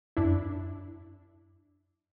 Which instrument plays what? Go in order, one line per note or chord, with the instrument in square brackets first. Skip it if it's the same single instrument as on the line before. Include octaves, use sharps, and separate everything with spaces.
[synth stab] F#2 D4 E4